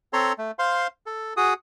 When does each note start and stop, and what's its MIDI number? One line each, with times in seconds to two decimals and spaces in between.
0.13 0.33 60
0.13 0.33 69
0.13 0.33 73
0.13 0.33 82
0.13 0.33 84
0.38 0.51 57
0.59 0.87 72
0.59 0.87 77
0.59 0.87 84
1.06 1.33 69
1.37 1.54 66
1.37 1.54 68
1.37 1.54 87